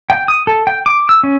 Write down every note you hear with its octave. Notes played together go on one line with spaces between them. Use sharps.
G5
D#6
A4
G5
D6
E6
C#4